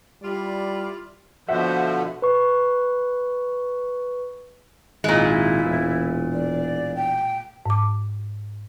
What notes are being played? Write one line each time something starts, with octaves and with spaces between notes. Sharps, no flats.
G3 E4 F4 D5
B2 D3 F3 F#4 C5 E5 F#5
B4 C#6
G#1 A#2 G#3 E4
E1
D5
G5
G#2 D6